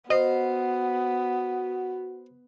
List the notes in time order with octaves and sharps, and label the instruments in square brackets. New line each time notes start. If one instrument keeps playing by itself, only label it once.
[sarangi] B3 [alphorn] F#4 [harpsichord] C5 F5 [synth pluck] D#5